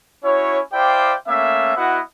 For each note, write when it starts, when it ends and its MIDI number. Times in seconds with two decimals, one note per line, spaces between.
0.24 0.59 61
0.24 0.59 64
0.24 0.59 66
0.24 0.59 73
0.73 1.14 64
0.73 1.14 67
0.73 1.14 72
0.73 1.14 74
0.73 1.14 77
0.73 1.14 79
1.28 1.74 57
1.28 1.74 58
1.28 1.74 61
1.28 1.74 76
1.75 2.00 59
1.75 2.00 64
1.75 2.00 66
1.75 2.00 75
1.75 2.00 78